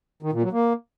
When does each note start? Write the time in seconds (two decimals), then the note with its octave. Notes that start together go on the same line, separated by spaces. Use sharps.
0.23 D#3
0.33 A#2
0.43 F#3
0.52 A#3